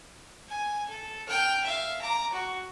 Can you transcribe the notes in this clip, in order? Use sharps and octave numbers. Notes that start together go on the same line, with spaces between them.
G#5
A4
G5 F6
E5 F5
A#5 D6
F#4